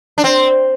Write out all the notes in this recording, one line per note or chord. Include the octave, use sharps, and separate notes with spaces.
D4
C4